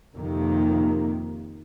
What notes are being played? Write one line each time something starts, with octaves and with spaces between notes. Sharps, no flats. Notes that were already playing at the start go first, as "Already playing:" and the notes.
F2 C3 D#3 A#3